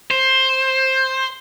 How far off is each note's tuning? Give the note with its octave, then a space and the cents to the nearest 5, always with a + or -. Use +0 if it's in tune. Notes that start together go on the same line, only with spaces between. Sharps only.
C5 +10